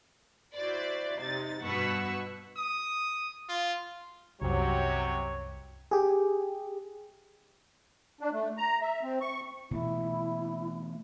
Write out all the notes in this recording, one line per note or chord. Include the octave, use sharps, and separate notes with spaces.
E4 F#4 C5 D5
C3 D#4 A6
G2 B2 B4 F#5 C#6 E6
D#6
F4
C2 F#2 C3 F#3 G4 C#5
G4 G#4
D4
A3
A#5
E5
C4
C#6
B2 E3 A3 E4